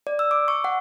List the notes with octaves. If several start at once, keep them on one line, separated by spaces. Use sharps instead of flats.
D5
E6
D6
C#6
F#5